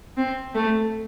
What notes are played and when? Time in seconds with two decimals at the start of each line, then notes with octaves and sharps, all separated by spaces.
0.17 C4
0.55 A3